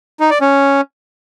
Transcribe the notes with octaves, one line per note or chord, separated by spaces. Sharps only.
D#4
D5
C#4